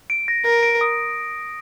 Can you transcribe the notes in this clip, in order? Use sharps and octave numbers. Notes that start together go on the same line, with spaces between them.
D7
A#6
A#4 A#6
D7
D#6